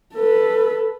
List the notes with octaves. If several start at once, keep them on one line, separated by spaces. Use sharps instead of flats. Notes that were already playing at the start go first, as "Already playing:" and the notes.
A4 B4